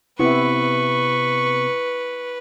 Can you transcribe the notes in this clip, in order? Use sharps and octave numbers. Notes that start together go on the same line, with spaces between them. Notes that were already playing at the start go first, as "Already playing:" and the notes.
C3 B3 C4 E4 B4 C#6